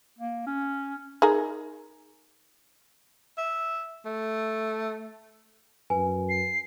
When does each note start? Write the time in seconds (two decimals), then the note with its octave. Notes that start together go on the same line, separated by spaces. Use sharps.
0.19 A#3
0.46 C#4
1.22 D#4 G#4 A#4
3.38 E5
4.05 A3
5.90 F#2 B4 G#5
6.29 C7